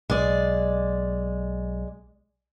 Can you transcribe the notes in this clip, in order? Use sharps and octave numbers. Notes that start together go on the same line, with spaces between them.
B1 G#3 D5